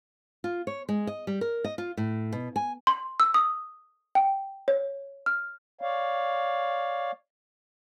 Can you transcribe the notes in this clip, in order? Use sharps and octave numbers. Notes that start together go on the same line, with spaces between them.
F4
C#5
G#3
D#5
G3
A#4
D#5
F4
A2
B2
G#5
C6
E6
D#6
G5
C#5
F6
C#5 D5 F5